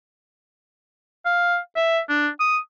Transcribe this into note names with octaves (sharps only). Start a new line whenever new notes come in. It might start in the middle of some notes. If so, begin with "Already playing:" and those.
F5
E5
D4
D#6